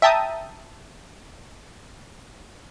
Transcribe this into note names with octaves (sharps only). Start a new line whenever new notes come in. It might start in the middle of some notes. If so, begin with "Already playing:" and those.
E5 G5 A5 A#5 D#6